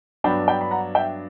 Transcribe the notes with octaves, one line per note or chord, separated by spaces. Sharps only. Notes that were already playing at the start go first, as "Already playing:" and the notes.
G2 F#3 B3 D4 G5 B5
G5 B5
B5
F#5 A#5
E5 G5